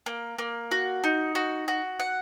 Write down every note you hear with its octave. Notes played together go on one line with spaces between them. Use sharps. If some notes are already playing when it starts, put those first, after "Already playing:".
A#3
A#3
F#4
D#4
F#4
F#4
F#5